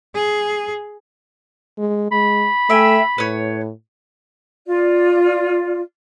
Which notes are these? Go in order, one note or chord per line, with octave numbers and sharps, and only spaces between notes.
G#4
G#3
G#3 B5
A3 E5 G5 G#5
A2 B4 C#5
F4 D5